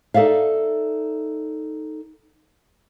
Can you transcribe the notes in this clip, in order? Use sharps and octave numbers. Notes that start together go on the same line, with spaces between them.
D#4 A4 D5 E5 F5